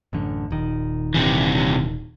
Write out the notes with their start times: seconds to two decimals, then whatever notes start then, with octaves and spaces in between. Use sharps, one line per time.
0.13 A1 F#2 D3
0.51 D#1 D#3
1.14 C3 E3